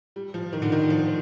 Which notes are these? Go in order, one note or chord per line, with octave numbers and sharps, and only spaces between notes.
G3
F3
D#3
D3
D#3
F3